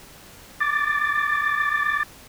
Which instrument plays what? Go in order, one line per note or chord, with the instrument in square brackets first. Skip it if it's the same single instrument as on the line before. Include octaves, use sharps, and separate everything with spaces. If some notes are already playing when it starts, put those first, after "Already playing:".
[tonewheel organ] D6 A6